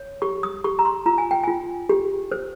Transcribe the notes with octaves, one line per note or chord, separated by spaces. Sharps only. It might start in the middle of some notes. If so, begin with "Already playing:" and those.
Already playing: C#5
G4 C#6
D#6
G4 C#6
A#5
C6
F4 A#5
G#5
G5
F4 G#5
G4
C5